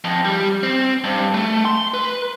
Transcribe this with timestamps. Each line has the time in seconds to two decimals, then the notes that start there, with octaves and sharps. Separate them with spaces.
0.04 F2
0.25 G3
0.63 C4
1.04 G2
1.34 A3
1.65 C6
1.94 B4